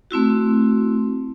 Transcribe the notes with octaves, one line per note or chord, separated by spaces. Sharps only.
A3 C4 E4 F#4